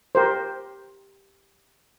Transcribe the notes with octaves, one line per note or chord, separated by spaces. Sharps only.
G4 A#4 C5